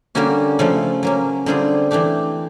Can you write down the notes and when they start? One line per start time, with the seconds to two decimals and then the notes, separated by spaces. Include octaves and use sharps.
0.15 D3 G3 A#3 C#4 F#4
0.59 C#3 F3 A3 C#4 F4
1.03 F#3 A#3 C#4
1.46 D3 G3 C4 F4 G#4
1.91 E3 A3 D4 G4